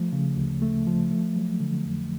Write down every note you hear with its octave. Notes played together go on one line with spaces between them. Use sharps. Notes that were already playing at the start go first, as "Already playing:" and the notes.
Already playing: F3 A3
C#3
D2
A3
F3
A3
F#3
D3
F2